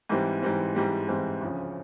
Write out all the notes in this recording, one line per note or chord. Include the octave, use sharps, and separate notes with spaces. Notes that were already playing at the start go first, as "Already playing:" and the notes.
G#2 E3 G3 C4
G#2 E3 G3 C4
G#2 E3 G3 C4
G#2 E3 G3 C4
D2 C#3 F3